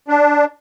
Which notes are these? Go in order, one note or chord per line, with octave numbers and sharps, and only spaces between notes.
D4